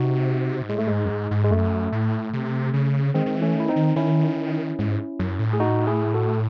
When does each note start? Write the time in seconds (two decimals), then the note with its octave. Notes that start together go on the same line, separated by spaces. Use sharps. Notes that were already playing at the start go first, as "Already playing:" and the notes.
Already playing: C3 D#4 F#4
0.62 G#2
0.69 A2 G#3
0.78 A3
0.87 G#2 G#3
1.05 F#2
1.10 G#2
1.31 G#2
1.44 G#3
1.51 F#2 A3
1.92 A2
2.33 C3
2.74 C#3
3.14 D#3 G#3 C4
3.26 D#3
3.35 E3
3.42 A3 C#4
3.55 D#3 E4
3.69 C4 D#4
3.76 D#3
3.96 D#3 C#4 E4
4.79 G#2
5.19 F#2
5.39 A2
5.53 G#4
5.60 D#4 F#4
5.87 E4 G#4
6.14 F#4 A4